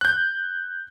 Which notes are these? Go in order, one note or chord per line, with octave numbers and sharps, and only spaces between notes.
F#6 G6